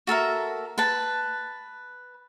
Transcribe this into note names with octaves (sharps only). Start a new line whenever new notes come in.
F#4 A4 A#4 E5
B4 A5